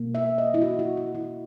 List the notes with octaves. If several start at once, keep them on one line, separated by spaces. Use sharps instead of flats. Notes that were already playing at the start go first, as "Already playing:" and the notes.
Already playing: B2 A#3
E5
D#5
E4
F#4
F#4
F#4
E4